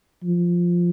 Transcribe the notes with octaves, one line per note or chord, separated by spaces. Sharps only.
F3